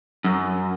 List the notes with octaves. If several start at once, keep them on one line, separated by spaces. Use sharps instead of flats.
F#2